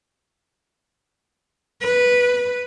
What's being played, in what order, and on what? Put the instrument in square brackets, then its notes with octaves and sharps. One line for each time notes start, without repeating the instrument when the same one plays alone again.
[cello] B4